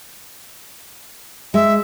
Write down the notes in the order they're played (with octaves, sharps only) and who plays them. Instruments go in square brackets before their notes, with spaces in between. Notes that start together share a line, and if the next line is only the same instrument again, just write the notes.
[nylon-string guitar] G#3 [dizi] E5